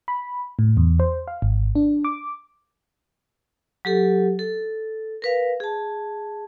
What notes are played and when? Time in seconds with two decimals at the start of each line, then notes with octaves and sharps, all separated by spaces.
0.08 B5
0.59 A2
0.77 E2
1.00 C5
1.28 F5
1.42 G#1
1.75 D4
2.05 D6
3.85 F#3 G4 A4
4.39 A4
5.22 A#4 B4 F5
5.60 G#4 A5